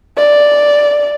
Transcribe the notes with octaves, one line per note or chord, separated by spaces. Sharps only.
D5